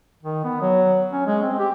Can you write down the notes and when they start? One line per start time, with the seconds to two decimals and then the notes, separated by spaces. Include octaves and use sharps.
0.23 D#3
0.44 B3
0.61 F#3
1.13 C#4
1.27 G#3
1.42 C4
1.59 G4